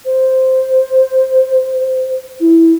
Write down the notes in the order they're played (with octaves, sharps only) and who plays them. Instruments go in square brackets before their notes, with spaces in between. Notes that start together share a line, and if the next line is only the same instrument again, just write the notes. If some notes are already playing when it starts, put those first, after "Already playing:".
[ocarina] C5
E4